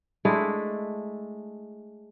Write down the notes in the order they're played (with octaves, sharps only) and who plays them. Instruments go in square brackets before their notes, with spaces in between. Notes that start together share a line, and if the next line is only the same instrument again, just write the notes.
[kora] G#3 A3 D4 E4